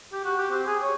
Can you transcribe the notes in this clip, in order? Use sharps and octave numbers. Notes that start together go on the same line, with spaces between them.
G4
F#4
G4
C4
G#4
C#5